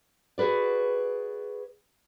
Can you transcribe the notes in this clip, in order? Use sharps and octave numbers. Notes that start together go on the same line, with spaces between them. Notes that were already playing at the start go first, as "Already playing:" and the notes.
F#4 G#4 A#4 B4 D5